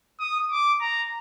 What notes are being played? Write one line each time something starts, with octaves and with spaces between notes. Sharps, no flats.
D#6
D6
A#5